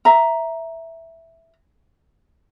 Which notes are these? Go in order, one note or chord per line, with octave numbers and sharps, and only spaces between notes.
E5 A#5